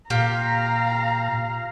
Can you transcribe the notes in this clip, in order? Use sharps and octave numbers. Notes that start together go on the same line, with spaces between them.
A#2 F4 G4 F5 A#5